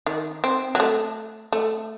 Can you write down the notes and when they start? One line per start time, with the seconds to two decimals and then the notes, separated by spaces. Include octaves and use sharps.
0.06 D#3
0.44 C4
0.75 F#3
0.80 A3
1.53 A3